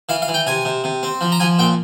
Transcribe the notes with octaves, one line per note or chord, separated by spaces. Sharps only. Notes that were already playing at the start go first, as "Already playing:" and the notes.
E3 F5
F5
E3
G5
C3 G#5
C3
C3
C4
F3
A#5
F3 G#5
A#2 G5